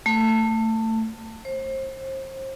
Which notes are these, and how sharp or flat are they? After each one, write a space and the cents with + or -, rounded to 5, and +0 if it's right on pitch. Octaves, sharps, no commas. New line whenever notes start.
A3 +20
C5 +30